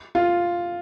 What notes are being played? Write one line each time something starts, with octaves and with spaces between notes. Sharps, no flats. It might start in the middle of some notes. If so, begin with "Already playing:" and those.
F4